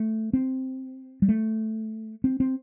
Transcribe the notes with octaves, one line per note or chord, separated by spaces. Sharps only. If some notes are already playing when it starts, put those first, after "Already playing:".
Already playing: A3
C4
G3
A3
C4
C4